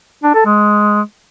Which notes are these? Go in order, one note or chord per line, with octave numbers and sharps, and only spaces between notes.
D4
A4
G#3